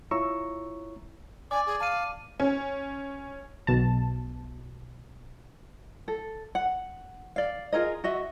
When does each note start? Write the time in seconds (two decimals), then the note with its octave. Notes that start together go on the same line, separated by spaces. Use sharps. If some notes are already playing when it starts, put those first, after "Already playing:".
0.11 E4 F4 C#5 A#5 C#6 E6
1.51 D5 G#5 D6
1.67 G#4
1.80 F5 A5 D#7
2.40 C#4
3.67 B1 B2 A5
6.08 A4
6.55 F#5
7.36 D5 F5
7.72 F4 G#4 A#4 D#5
8.04 F#4 D#5 E5